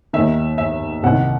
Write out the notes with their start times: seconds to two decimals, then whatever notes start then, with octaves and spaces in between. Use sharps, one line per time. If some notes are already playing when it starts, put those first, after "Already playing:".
0.13 D#2 D#3 E5
0.58 E5
1.03 C2 C3 D#3 F#5